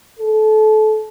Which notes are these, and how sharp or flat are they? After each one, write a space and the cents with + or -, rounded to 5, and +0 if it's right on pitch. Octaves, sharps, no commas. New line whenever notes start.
A4 -25